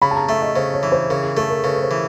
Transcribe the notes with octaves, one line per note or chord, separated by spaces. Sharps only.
C#3 B5
A5
A#5
A3 E5
D#5
C#3 C5
C#5
E3
C5
C#3 A#4
G#4
A3 A4
A#4
C#3 B4
B4
C5
E3